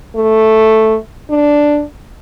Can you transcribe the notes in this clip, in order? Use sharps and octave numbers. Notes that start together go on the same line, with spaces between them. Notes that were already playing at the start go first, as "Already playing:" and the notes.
A3
D4